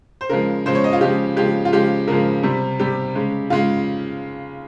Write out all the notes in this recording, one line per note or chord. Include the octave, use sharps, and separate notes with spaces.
C5
C#3 F3 G#3 A#4
C#3 F3 G#3 C5
C#5
D#5
F4
C#3 F3 G#3 G4
C#3 F3 G#3 G4
F4
C#3 F3 G#3 G4
C#3 F3 G#3 A#4
C3 G3
C3 G3 G4
C#3 G#3
C#3 G#3 F4